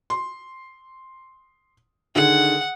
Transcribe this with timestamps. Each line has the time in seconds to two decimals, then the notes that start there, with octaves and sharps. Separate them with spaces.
0.10 C6
2.16 D3 D#3 G#4 F#5